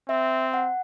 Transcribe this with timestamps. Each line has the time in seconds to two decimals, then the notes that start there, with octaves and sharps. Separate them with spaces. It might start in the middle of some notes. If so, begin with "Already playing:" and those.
0.08 C4 E5
0.54 F#5